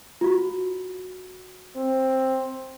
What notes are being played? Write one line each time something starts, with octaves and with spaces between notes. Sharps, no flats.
F4 F#4
C4